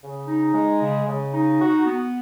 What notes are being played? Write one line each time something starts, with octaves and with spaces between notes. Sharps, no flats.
C#3
D#4
G#3
C#3
C#3
D#4
F#4
B3